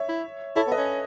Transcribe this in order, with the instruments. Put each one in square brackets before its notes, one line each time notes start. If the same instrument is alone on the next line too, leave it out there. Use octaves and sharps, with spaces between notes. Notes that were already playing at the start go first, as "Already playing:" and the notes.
Already playing: [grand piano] C#5 E5
[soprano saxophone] E4
[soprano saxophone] E4 [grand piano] A4 C#5
[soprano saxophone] B3
[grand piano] B4 D#5
[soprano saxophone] C#4